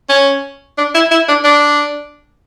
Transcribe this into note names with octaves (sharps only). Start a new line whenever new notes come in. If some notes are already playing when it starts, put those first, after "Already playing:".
C#4
D4
E4
E4
D4
D4